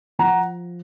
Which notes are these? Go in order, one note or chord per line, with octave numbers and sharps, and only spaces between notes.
F3 F#5 A#5